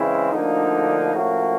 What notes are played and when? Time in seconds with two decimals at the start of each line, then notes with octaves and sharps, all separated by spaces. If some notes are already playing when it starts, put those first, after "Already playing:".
Already playing: C#3 E3 G#3 C4 E4
0.31 D2 D3 F3 A#3 D#4
1.15 A2 F3 A#3 C#4 F#4